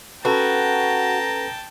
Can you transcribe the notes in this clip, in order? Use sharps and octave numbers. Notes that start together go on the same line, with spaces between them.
C#4 F#4 A4 B4 G5 A5 A#5